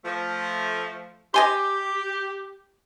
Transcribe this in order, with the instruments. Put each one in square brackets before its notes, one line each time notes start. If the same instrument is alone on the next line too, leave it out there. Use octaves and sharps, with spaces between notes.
[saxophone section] F3 A3
[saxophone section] G4 [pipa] D#5 G#5 C6